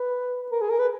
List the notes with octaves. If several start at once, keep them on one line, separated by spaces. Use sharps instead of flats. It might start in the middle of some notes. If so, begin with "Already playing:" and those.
Already playing: B4
A#4
G#4
A#4
B4